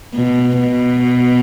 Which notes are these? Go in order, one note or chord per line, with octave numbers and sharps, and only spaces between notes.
B2
B2